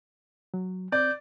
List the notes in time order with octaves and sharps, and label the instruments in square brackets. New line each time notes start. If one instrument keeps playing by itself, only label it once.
[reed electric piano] F#3
[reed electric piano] C4 [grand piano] D5 [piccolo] G6